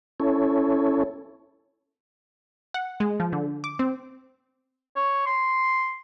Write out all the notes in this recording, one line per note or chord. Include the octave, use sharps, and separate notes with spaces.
C#4 E4 A4 C#5
F#5
G#3
F3
D3
D6
C4
C#5
C6